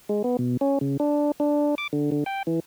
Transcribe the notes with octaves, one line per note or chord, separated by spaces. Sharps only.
G#3
B3
B2
C#4
C#3
D4
D4
D6
D3
D3
G5
E3